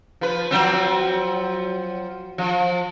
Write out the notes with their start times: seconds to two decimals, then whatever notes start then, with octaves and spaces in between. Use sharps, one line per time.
0.21 F3 B4
0.51 F3 F#3 C4
2.38 F3